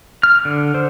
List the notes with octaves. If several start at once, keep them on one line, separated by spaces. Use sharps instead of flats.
F6
D3
C5